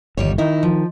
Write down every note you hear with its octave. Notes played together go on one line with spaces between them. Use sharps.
G1 D#2 G3 C#5
D#3 D#4 E4
F3